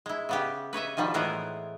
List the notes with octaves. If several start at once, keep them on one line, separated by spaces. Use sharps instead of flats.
G#3 E4
C#3 B3 G4
B4 C#5 D#5 E5
B2 D#3 F3 G3
A2 E3 G#3 B3 A#4 C5